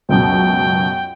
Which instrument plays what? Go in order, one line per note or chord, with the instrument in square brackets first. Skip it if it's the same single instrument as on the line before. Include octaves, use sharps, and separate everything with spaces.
[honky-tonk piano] C#2 F#2 B2 [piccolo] G5